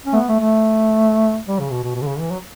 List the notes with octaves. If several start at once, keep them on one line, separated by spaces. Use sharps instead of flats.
C#4
A3
B3
A3
A3
G3
C#3
B2
B2
B2
D3
C#3
E3
F#3